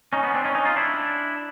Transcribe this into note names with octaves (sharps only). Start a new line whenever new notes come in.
C#4 D#4
B3 C#4
C4 D4
C#4 D#4
C#4 D#4
D#4 F4
D4 E4